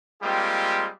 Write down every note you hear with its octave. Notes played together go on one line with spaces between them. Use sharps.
G3 G#3 A#3 C4 F4 G4